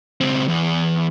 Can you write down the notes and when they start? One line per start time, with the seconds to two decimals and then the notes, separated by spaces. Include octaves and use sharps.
0.21 C#2 C4
0.48 E2